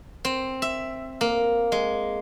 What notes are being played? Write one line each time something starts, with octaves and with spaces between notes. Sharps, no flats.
C4
E5
A#3
G#3